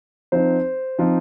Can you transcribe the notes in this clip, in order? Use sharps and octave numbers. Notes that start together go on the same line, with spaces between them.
F3 C4 D#4 C5
F3 C4 D#4